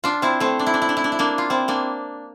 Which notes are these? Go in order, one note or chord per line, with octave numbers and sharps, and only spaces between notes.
D4 F4
C4 E4
A3 C4
D4
E4
D4
E4
D4
E4
D4
E4
A#3 D4
F4
C4 E4
A#3 D4